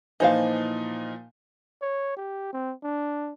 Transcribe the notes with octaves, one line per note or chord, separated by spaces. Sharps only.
A#2 E3 F3 D#4 C5 F5
C#5
G4
C4
D4